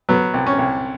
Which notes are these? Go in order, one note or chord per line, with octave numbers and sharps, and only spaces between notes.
F#3 B3
C2
C#4
C2